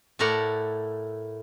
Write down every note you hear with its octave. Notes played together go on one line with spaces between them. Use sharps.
A2 A3 E4 A#4 D5 F#5